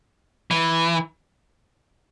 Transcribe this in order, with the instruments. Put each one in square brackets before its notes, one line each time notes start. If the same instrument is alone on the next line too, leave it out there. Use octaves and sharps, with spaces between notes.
[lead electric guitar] E3